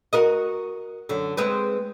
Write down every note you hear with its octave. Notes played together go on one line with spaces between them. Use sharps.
F#4 A#4 D#5
F#2 D3
G#3 C4 B4